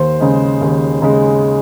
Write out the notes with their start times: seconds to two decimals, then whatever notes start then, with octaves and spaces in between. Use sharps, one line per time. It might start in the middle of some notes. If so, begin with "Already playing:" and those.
Already playing: D#2 C5
0.20 C#3 G#3
0.61 D#2
1.02 C#3 G#3